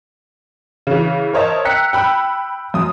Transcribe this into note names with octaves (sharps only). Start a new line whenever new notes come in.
C#3 E3
A#4 C5 C#5 D#5 E5 A5
G5 A#5 E6 F#6 B6 C#7
G5 B5 E6
F#2 D#6